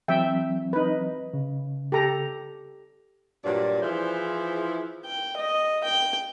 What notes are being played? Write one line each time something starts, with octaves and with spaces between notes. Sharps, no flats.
E3 F#3 C4 E5 G5
D#4 B4
C#3
G4 A4 A#5
G2 A#2 F#3 D5
E3 F3 E4 G#4 C5
G5
D#5
G5